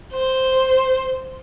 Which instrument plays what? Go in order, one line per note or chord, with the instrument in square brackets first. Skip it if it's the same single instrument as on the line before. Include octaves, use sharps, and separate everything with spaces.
[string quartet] C5